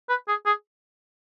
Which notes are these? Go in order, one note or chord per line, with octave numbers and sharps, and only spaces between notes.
B4
G#4
G#4